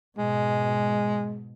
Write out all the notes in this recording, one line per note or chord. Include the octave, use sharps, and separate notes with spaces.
G#2 B2 G#3